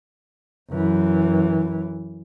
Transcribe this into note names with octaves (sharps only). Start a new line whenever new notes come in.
F#2 E3